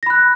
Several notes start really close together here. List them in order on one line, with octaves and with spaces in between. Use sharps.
A#6 B5 F#6